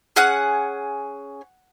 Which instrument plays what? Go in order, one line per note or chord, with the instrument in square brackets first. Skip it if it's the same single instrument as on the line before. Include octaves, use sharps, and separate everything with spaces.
[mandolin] C#4 G#4 F#5